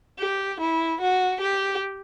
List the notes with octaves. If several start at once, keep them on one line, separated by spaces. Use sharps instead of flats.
G4
E4
F#4
G4